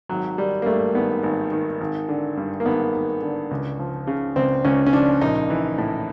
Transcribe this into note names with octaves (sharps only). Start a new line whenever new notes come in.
G#1 F#3
D#3 G3
A#3
G2 A3
G#1 B3
G#1
D#3
G#1
D3
G2
A#3
G#1 B3
G#1
D3
C#2
F3
C#3
C#2 C4
C#2 C#4
C#4
F3 D4
A#1 D#4
E3
A2